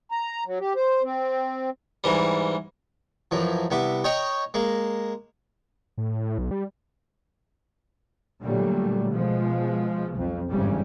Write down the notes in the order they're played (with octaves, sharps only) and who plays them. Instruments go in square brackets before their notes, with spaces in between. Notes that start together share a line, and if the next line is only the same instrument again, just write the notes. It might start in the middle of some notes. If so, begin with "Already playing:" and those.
[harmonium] A#5
F#3
G4
C5
C4
[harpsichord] G#2 E3 G3
F#2 E3 F3
C2 B3 E5 D6
C#5 D#5 G5 A#5 C#6
G#3 A#3
[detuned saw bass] A2
B1
G3
[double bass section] A#2 D3 F#3 G3 A3
B2 F3 G#3
B1 F2
G1 G#2 C#3 E3 G3